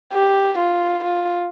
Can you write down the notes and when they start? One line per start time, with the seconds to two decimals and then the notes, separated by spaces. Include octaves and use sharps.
0.13 G4
0.58 F4
1.04 F4